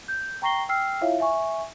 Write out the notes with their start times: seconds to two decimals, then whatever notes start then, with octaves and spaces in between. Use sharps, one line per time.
0.08 G6
0.42 G5 A#5 C#6 A#6 C7 G7
0.69 G5 E6 F6 C7
1.01 E4 F4 C#5 E5 F5
1.20 E5 G#5 C#6